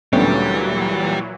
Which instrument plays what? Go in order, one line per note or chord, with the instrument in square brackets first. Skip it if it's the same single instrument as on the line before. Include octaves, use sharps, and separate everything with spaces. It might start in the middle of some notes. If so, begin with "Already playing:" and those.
[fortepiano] D2 B3 C#4 [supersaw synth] A#2 E3 F#3 [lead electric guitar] G3